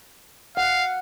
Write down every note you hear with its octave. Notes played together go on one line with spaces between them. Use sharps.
F5 F#5